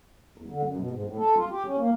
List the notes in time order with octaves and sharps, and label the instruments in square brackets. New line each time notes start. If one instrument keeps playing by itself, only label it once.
[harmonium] E2
D3
F#2
B2
G#2
A2
A4
F4
G4
C#4
A#3